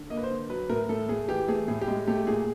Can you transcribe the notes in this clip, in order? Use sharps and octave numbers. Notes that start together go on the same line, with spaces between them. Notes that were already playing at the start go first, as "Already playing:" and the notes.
Already playing: D3
A#3 D#5
B4
C5
D3
F#3 B4
A2 A#4
A2 A4
A3 G#4
E3 G4
A3 G#4
A2 G#4
G4
G#3
A3 G4
A#2 G#4